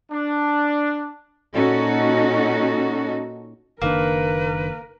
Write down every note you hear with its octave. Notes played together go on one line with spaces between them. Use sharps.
D4
A#2 C#4 D#4 F#4 A4
F#1 D#3 A#3 D4 A#4 B4